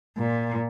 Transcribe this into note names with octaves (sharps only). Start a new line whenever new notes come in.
A#2